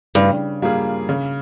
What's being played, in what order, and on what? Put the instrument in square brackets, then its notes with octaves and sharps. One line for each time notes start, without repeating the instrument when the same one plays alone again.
[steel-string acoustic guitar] G2 [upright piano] C#3
[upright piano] G3 A#3 F4 G#4
C#3